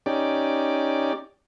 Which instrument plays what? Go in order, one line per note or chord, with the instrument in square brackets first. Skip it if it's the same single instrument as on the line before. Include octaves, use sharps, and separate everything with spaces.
[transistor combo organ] C#4 D#4 G4 D5